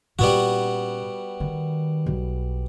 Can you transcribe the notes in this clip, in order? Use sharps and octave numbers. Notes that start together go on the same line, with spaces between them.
A#2 G3 B3 C#4 F#4
D#3
B1